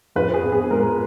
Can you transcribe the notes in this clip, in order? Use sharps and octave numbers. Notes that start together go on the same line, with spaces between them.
F2 B4
G#4
B3
G#4
G#3 A#4